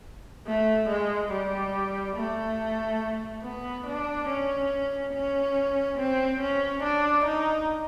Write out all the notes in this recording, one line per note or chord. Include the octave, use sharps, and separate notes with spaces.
A3
G#3
G3
A3
B3
D4
C#4
C#4
C4
C#4
D4
D#4